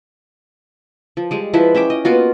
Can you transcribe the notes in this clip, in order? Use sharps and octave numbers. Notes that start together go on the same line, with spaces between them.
F3
G3 G#3
F3 E4 B4 E5
C#4 E5 G5 D6
D#5
A#3 B3 F4 F#4